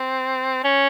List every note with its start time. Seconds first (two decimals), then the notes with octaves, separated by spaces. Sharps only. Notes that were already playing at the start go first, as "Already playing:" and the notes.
Already playing: C4
0.64 C#4